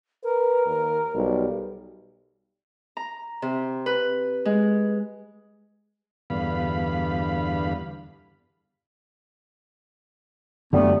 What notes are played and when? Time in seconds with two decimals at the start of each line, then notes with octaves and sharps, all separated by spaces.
0.24 A#4 B4
0.66 D#2
1.15 B1 G3
2.97 A#5
3.42 C3
3.86 B4
4.45 G#3
6.30 E2 G2 D3 B3 F5 B5
10.73 F#2 D3 G3 A3 B3